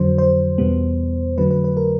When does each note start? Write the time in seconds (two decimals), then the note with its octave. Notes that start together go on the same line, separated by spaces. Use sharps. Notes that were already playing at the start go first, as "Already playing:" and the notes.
Already playing: F2 D3 F#3 C5
0.18 C5
0.58 E2 B2 G3 B3
1.37 F2 D3 F#3 A3 B4
1.51 B4
1.64 B4
1.77 A#4